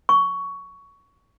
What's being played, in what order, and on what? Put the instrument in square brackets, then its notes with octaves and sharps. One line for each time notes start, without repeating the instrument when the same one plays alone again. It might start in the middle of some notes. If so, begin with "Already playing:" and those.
[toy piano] C#6